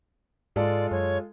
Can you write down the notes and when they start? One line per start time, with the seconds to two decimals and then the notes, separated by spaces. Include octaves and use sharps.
0.56 G#2 G#3 F4 A4 D5
0.91 F#2 C#5